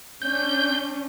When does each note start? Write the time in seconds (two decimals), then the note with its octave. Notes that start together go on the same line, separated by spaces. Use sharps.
0.22 C#4 D4 G6